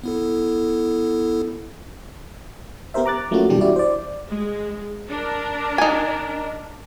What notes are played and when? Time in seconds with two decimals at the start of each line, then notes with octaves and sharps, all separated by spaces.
0.04 B3 E4 A4
2.94 B3 G4 A#4 C5 E5
3.06 A#5 D6 F#6 A6
3.31 F#3 A3 A#3 C#4 F4 F#4
3.49 B2 E3 G3 D4 G4
3.61 E4 F#4 D5
3.76 C5 D5
4.28 G#3
5.08 D4 A#4
5.78 D#4 G#5